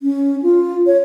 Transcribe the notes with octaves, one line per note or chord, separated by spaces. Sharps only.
C#4
F4
C#5